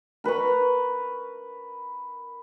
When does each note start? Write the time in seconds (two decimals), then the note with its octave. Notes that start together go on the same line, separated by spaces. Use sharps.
0.24 A#4 B4 A#5 C#6